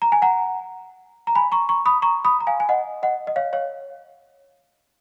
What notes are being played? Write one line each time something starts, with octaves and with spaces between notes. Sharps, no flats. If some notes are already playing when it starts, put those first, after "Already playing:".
A#5
G#5
F#5 A#5
A#5
G#5 B5
A#5 C#6
A#5 C#6
B5 D#6
A#5 C#6
B5 D#6
A#5
F5 G#5
G#5
D#5 F#5
D#5 F#5
D#5
C#5 F5
C#5 F5